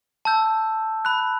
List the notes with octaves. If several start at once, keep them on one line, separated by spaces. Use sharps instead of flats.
A5 E6 G6
B5 F#6